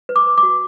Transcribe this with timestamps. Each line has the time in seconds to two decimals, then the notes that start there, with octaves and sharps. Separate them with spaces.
0.09 B4
0.16 D6
0.27 B4
0.38 D6
0.43 F#4